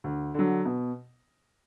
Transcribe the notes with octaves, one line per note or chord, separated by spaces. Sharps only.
D2
D3 F#3
B2